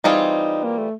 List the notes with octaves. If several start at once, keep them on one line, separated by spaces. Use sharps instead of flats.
E3 G3 C4 D#4 F4 G#4
A#3
A3